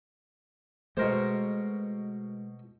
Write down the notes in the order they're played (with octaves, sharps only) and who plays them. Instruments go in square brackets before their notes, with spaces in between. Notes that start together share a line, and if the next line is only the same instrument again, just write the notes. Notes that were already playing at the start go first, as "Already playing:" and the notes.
[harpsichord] B2 A#4 C5 [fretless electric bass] G#3 A3